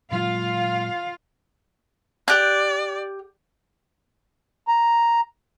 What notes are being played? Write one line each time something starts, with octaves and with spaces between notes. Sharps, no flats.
A#2 F#3 G#3 F4 F5
G4 D5 F#6
A#5